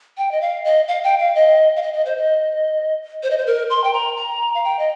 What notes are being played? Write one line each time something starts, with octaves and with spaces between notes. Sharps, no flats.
G5
D#5
F5
D#5
F5
G5
F5
D#5
F5
D#5
D#5
C5
D#5
C5
D#5
C5
A#4
C6
G5
A#5
A#5
F5
G5
D#5